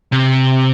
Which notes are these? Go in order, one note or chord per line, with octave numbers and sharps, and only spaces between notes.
C3